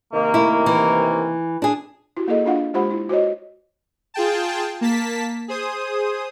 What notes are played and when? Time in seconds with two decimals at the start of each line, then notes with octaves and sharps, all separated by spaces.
0.14 C3 D#3 A#3
0.34 A3 E4
0.66 E3
1.62 D4 G#4
2.17 E4 F#4 G4
2.28 A#3 E4 G#4 A4 D#5
2.46 D4 F4 F5 F#5
2.74 G#3 F4 G4 C5 F#5 B5
2.90 E4
3.09 F#4 C5 C#5 D#5
4.14 F4 G#4 G5 A5
4.81 A#3 A5 B6
5.48 G#4 C5 D#6